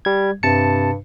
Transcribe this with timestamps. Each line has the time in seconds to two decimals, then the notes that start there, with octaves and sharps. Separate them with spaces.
0.05 G3 G#6
0.43 G2 C3 A5 C#7